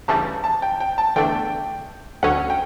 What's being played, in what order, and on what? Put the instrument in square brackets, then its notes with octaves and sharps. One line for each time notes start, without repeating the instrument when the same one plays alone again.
[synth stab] D2 C#3 E3 G3 [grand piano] A5
[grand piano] A5
G5
G5
A5
[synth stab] E2 D3 A3 D4 [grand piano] G5
[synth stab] D2 D3 F#3 C#4 [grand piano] F#5
[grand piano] G5